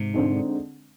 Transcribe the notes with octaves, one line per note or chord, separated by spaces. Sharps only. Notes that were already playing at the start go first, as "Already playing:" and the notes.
Already playing: G#2 C3
D3 G#3 C4 D#4